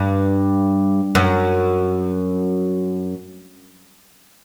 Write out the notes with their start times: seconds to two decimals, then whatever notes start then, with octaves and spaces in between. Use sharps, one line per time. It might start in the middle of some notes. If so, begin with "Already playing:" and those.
Already playing: G2
1.15 F#2